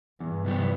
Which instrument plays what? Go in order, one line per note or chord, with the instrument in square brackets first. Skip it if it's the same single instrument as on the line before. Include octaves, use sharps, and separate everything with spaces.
[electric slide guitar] E2 [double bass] G2
[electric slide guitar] C3 E3 G3 B3